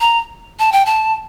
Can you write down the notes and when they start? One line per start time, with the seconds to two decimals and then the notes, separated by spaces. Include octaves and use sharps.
0.01 A#5
0.59 A5
0.72 G5
0.86 A5